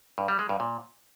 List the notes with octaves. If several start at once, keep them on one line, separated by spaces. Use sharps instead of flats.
G2
G3
G#3
G2
A#2